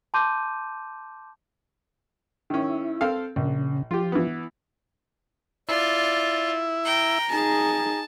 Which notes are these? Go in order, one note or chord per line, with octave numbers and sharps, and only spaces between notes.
A5 C6 D6 G6 D#7
D#3 C#4 E4
C4 A4 F5
A#1 C#3
F3 F4 G4
E3 B3
E4 F4 D5
G5 A#5
D#4 G#4 A5